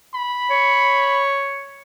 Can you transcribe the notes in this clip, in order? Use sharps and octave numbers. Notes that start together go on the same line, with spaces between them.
B5
C#5